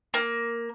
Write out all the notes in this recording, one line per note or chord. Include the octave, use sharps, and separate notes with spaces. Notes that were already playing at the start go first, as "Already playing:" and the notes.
A#3